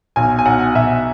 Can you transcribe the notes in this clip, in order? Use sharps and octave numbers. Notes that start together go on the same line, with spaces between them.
B1 G#5
G#5
B1 F#5
B1 E5